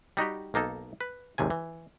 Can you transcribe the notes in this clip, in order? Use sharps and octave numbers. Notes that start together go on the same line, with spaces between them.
G3 D#4 F#4 G4
B1 A#3 D#4 A4
B4
G#1 D#2 C3 G#5
E3